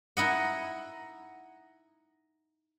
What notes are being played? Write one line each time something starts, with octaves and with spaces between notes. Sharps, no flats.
D#4 E4 D#5 F#5